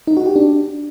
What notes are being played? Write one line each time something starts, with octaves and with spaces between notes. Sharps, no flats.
D#4
F#4
G4
D4